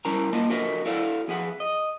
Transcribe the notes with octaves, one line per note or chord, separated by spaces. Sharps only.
G3 C#4 E4 A#4 A5 A#5
A#3 F4 D#5 A5
D3 F#3 F#4 A#4 D#5 E5
E4 F#4 A4 D5 F5
F2 G#4 E5 F#5
D#5